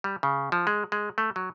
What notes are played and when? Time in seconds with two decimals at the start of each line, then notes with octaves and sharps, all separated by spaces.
0.04 G3
0.23 C#3
0.52 F3
0.67 G#3
0.92 G#3
1.18 A3
1.36 F#3